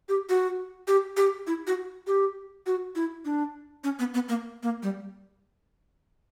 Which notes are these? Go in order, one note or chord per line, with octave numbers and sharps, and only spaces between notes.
G4
F#4
G4
G4
E4
F#4
G4
F#4
E4
D4
C#4
B3
B3
A#3
A#3
G3